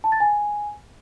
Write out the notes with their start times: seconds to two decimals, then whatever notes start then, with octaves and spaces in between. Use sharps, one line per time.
0.04 A5
0.12 A6
0.20 G#5